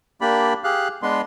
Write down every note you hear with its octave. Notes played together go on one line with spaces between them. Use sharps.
A#3 D4 G4 D5 B5
G4 G#4 F5 F#6
G#3 B3 D4 B4 C6